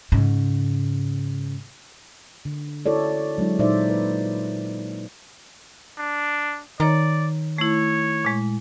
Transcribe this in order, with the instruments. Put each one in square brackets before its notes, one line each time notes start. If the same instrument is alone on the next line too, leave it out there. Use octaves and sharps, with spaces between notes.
[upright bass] G#2 C#3
[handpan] D3
E4 F#4 A4 C#5 D5
F#3 G#3 D4 E4
A#2 D#4 C5 D5 E5
B4
[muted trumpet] D4
[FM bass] D#3 [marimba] C#5 A#5 [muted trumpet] D5
[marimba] A3 E4 [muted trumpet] C#5
[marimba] A#2 G#3